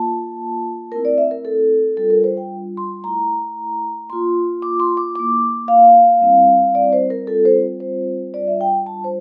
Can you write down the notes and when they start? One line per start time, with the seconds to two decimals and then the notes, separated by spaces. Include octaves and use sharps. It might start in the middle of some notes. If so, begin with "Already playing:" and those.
Already playing: A#3 F4 A5
0.91 A3 C4 E4 A#4
1.05 D5
1.18 E5
1.31 A#4
1.45 A4
1.97 G3 D4 F4 A4
2.10 A#4
2.24 C5
2.37 G5
2.77 C6
3.03 A3 E4 A#5
4.09 A#3 F4 C6
4.62 D6
4.80 C6
4.97 D6
5.15 A#3 E4 D6
5.68 F5
6.21 G3 C4 E4
6.75 D5
6.93 C5
7.10 A#4
7.27 G3 C4 F4 A4
7.45 C5
7.80 C5
8.34 G3 D4 F4 D5
8.47 E5
8.61 G5
8.86 A5
9.04 C5